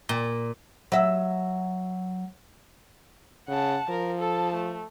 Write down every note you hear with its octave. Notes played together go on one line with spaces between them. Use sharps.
A#2
F#3 E5
C#3 F#5 A5
F3 A#4
A4 A5
A3